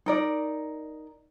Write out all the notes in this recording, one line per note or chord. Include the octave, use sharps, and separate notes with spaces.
D#4 A#4 D5